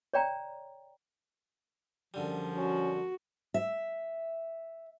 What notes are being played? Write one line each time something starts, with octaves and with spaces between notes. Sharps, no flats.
C#5 D5 G5 A#5
F#2 D3 F3 G3
C#4 F#4
E5